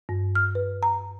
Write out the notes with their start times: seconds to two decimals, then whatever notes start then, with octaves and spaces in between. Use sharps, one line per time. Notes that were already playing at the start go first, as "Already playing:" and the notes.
0.09 G2
0.35 F6
0.55 B4
0.83 A#5